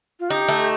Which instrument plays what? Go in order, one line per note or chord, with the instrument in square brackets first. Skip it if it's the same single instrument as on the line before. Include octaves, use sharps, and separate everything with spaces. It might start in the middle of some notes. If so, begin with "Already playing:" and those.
[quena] F4
[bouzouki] D#4 [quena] G4
[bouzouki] A3